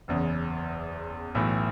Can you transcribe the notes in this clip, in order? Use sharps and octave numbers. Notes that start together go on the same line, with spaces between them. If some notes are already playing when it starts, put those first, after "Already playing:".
F#1 E2 C#3
B1 A2 E3